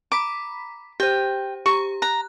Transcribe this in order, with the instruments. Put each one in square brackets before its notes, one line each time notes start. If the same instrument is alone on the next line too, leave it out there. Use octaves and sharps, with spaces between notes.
[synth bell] A#5 B5 B6 [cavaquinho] D6
[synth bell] G4 C5 [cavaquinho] G5
[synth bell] G4 A#5 [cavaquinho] C#6
[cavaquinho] A#5 [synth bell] F#6